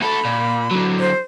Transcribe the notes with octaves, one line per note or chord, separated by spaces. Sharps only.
D2 A4 B5
A#2
D3 F#3
C5